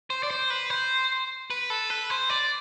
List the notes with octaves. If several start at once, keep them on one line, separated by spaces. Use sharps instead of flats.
C5
D5
C5
B4
C5
B4
A4
B4
C5
D5